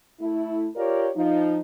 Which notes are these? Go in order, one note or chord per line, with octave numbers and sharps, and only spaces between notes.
A3 E4
F4 G4 A#4 C#5 D5
F3 D#4